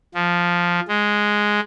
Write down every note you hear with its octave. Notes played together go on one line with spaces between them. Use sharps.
F3
G#3